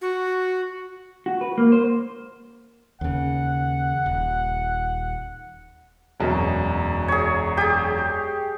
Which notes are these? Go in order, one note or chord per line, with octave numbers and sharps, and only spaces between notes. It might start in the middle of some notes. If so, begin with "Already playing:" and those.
F#4
F#4
B4
A#3
C5
D#2 C#3 F#5
D#1
E1 F#2 B2
G#4 C#5
G4 G#4